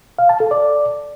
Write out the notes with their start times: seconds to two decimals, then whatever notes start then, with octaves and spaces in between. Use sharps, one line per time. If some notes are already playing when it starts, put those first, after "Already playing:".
0.19 F5
0.29 A5
0.40 A4
0.51 D5